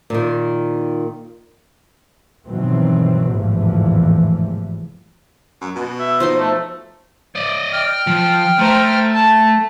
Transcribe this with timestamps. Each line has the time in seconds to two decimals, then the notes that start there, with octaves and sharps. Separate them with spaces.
0.10 A#2 D#3
2.47 G2 B2 D#3 E3 F#3 C4
3.32 G#1 E2 A2 C3 E3 F3
5.61 F#2
5.76 B2
5.99 E5
6.20 F3 D#4 C5 C6
6.38 A3
7.35 D5 D#5
7.72 G5 F6
8.07 F3
8.59 A3 C5 A#5
9.14 A5